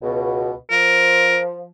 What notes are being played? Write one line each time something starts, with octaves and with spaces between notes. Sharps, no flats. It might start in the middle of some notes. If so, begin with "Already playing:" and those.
C#2 B2
F3 A#4